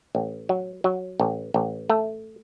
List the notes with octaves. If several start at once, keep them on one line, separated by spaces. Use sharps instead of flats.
A1
F#3
F#3
A1
A1
A3